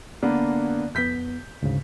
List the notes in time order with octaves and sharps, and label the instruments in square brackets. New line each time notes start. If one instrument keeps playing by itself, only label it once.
[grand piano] D3 A#3 B3 [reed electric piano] D5
[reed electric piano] F2 B3 [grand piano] G6 B6
[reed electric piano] D2 G#2 C#3